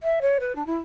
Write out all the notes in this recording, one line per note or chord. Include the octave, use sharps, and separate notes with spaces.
E5
C#5
B4
D4
E4